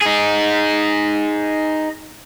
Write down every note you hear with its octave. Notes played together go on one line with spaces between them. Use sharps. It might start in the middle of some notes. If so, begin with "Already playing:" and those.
D#4 G#4